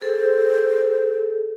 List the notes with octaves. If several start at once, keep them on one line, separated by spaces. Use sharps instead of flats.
G#4 A4 C5